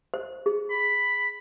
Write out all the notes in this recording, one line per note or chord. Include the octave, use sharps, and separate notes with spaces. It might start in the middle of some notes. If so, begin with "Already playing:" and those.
C5
G#4
B5